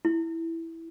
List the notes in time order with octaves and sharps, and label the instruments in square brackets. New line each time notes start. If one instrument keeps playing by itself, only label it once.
[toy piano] E4